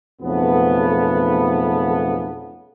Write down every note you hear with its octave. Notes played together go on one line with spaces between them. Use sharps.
B1 F2 C#3 A3 B3